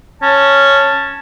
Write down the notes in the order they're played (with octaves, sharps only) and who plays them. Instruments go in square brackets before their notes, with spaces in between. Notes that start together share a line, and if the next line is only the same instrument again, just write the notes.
[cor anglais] C#4 [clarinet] A5